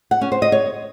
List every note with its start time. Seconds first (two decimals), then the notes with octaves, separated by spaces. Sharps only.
0.11 F#5
0.21 C#4
0.32 C5
0.42 D#5
0.52 C#5